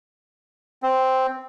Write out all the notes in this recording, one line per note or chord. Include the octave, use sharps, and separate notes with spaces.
C4